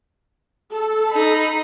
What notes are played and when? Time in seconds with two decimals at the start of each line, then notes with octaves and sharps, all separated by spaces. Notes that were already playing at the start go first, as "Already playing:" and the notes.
0.72 A4
1.10 D#4 B5